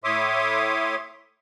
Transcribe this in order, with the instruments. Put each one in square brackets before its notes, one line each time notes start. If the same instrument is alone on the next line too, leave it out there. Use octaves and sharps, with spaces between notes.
[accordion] A2 C#5 E5 C6 D6 D#6